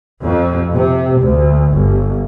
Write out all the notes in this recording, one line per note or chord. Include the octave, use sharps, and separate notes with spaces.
F2
C3
D2
G1